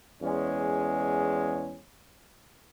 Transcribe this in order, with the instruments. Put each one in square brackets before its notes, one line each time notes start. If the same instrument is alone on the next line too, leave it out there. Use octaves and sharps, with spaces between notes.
[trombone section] E2 G#3 C#4